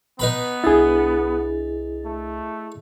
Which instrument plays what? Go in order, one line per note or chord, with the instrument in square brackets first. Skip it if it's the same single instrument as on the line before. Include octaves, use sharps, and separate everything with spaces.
[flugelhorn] B3 [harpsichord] D#4 B4 B5
[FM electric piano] C2 D4 A6 [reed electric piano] E4 G#4
[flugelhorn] A3